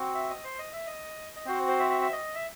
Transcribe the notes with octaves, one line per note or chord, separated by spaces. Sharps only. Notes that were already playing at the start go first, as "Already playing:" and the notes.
Already playing: C4 F#4
E5
D#5
C5
D#5
E5
D#5
D#5
C4 F#4 C5
C5
E5
E5
E5
D#5
E5